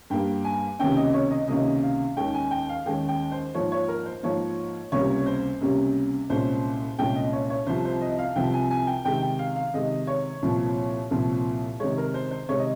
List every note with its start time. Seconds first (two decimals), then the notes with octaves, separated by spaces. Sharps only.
0.10 G2 G3 A#3 G5
0.45 G#5
0.79 C#2 C3 D#3 A#3 C#4 G5
0.97 D#5
1.14 C#5
1.30 D#5
1.48 C#2 C3 D#3 A#3 C#4 D#5
1.83 F5
2.17 D#2 D#3 G#3 C#4 G5
2.34 G#5
2.51 G5
2.69 F5
2.86 D#2 D#3 G#3 C#4 G5
3.08 G5
3.32 C5
3.55 G#2 F3 A#3 C#5
3.72 C#5
3.88 A#4
4.06 C5
4.23 G#2 F3 A#3 C#5
4.92 C#2 C3 G3 A#3 C#4 C#5
5.26 C5
5.61 C#2 C3 G3 A#3 C#4
6.30 C2 A#2 G#3 C#4 C5
6.99 C2 A#2 G#3 C#4 G5
7.16 D#5
7.33 C#5
7.50 C#5
7.67 C2 C3 F3 C4 C5
7.85 C5
8.01 D#5
8.19 F5
8.36 C2 C3 F3 C4 G5
8.54 G#5
8.71 G#5
8.87 G5
9.05 C3 D#3 G#3 G5
9.22 G5
9.39 F5
9.56 F5
9.74 C3 D#3 G#3 D#5
10.07 C#5
10.42 C2 A#2 F3 C4
11.11 C2 A#2 F3 C4
11.80 C3 D#3 G#3 C#5
11.98 A#4
12.14 C5
12.31 C5
12.49 C3 D#3 G#3 C#5
12.59 D#5